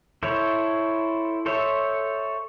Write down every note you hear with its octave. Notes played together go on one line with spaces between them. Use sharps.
E4 A4 C5 C#5
A4 C5 C#5 E5